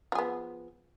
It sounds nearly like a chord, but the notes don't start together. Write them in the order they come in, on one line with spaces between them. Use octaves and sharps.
F3 G#4 B3